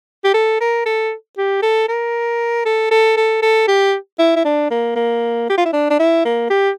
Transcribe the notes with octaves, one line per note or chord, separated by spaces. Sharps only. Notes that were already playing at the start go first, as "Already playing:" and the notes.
G4
A4
A#4
A4
G4
A4
A#4
A4
A4
A4
A4
G4
E4
E4
D4
A#3
A#3
G4
F4
E4
D4
D4
E4
A#3
G4